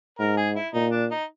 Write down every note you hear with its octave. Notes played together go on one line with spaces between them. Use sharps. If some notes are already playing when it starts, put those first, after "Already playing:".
G#2 A#4
G#4
E4
A#2 D#4
D4
D#4